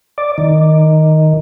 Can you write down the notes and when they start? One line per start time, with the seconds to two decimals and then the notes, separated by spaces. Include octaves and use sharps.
0.18 D5
0.38 D#3